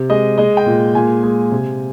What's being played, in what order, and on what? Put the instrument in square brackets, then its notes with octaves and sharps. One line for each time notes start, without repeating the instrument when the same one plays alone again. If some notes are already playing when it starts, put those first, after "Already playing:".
Already playing: [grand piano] C3
G#3 D#5
G#3 D#5
G5
A#2
A#2 G#5
G#3
C3